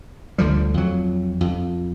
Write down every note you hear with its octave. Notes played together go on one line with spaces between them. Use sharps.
D2 D3 F3 G3
F2 F#3
F2